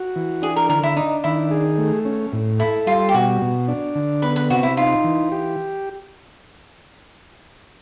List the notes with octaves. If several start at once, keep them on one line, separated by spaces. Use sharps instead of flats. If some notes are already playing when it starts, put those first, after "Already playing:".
Already playing: F#4
E3
D4 G#4
A#4
D3 A#4
E4
D4 D#4
D#3 E4
G#4
A3
C#4
A2
E4 A4
G3 F4
G4
B2 F#4
B2
D4
D3
B3 B4
B4
C3 F#4
E4
D#4 F4
E3
G4